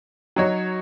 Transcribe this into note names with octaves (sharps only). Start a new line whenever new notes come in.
F#3 D#4 F#4 C#5